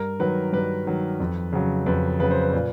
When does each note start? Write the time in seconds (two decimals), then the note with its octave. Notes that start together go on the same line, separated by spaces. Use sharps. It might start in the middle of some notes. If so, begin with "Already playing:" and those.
Already playing: G2 A#4
0.20 D#3 F#3 B4
0.53 G2 B4
0.87 D#3 F#3
1.20 F2
1.53 C#3 F#3
1.86 F2 B4
2.20 C#3 F#3 B4
2.31 C5
2.43 B4
2.53 A#2